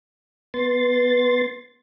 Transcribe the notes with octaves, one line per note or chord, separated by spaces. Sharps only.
B3 C6 A6